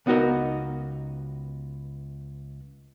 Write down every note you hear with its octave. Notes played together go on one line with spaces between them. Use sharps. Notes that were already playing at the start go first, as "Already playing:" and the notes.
C#2 B3 D#4 F#4 A#4 D#5